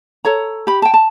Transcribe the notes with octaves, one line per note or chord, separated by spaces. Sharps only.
A4 C#5 A#5
G4 B5
G5 A5
A5